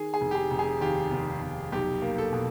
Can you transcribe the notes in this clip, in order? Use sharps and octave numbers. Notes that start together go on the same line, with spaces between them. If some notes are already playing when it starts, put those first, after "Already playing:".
Already playing: D#3 G#4
G#4
F1
G4
G#4
F1
G#4
D#2 G4
F1
F1
B1 G4
A#3
A4
B2